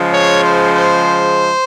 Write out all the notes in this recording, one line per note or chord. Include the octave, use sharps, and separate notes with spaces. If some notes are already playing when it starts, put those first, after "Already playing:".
Already playing: C#3 F3 G#3
C#5
C5
C5